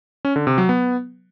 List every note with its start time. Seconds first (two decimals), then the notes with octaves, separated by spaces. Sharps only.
0.25 C#4
0.36 D3
0.47 C3
0.58 F#3
0.69 B3